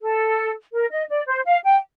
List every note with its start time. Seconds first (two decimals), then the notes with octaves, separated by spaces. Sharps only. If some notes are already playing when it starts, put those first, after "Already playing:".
0.01 A4
0.72 A#4
0.90 D#5
1.09 D5
1.27 C5
1.45 F5
1.63 G5